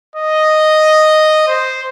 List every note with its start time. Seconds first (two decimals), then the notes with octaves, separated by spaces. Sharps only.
0.16 D#5
1.47 C5